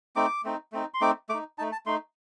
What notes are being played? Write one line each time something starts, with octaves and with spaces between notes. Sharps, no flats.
A3 C4 D#4 D6
A3 C4 D#4
A3 C4 D#4
C6
A3 C4 D#4 D6
A3 D#4 D6
A3 D#4 A5
A5
A3 D#4 C6